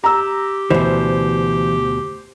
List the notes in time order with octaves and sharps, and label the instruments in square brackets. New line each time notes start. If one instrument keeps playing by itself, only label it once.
[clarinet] G4 [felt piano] A#5 E6
[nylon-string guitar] D2 B2 [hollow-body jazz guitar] E3 [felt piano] C5